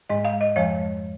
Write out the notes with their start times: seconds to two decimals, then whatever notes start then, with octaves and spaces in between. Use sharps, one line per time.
0.09 G#2 G#3 D#5
0.25 F5
0.41 D#5
0.56 F2 F3 G#3 C#5